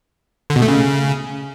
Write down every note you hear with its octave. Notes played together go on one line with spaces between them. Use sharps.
D3
B2
A3
C#3